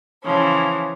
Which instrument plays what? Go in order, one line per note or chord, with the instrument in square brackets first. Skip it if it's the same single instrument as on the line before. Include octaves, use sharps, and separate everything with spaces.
[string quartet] C#3 E3 F3 C#4